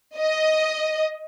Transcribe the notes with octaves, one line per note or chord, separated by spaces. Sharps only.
D#5